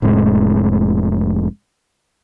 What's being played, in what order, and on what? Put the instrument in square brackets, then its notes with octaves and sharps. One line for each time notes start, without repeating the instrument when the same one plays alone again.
[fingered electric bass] F1 A2 C3 G#3